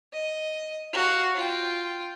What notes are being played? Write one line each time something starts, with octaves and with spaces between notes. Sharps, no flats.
D#5
F#4 F5
F4 G5